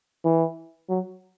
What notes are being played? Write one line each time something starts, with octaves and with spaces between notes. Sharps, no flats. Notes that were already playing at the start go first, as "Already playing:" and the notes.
E3
F#3